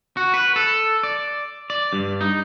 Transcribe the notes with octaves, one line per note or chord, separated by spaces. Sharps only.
F#4
B4
A4
D5
D5
G2
D#4